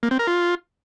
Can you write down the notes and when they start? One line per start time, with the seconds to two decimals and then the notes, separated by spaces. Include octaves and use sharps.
0.03 A#3
0.11 C4
0.19 A#4
0.27 F4